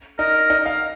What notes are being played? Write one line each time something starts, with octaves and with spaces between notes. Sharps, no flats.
D#4 A#4
D#4
F5